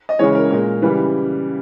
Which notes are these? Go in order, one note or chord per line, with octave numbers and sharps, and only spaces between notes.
D#5
C#3 E3 G#3 C#5
A#4
A#2 G#3 A#4
C#3 E3 G3 B4